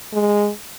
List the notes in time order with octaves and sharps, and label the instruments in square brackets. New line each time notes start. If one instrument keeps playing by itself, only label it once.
[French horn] G#3